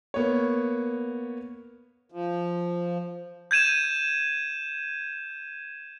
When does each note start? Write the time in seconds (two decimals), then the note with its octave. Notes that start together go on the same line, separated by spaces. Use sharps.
0.14 A#3 B3 C#5
2.12 F3
3.51 G6 G#6 D#7 E7